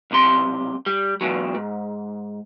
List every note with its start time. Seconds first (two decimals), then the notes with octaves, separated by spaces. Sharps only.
0.11 B1 C3 C6
0.86 G3
1.21 E2 G2 B2 F#3
1.55 G#2